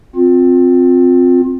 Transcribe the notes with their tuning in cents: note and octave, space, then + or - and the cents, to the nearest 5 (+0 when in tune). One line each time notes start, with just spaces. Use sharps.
C4 +0 F4 +25